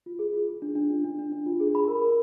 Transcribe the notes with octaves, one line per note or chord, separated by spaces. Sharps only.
F4
G#4
F4
G#4
D4
D4
F4
D4
D4
D4
F4
G#4
B5
A#4
A#4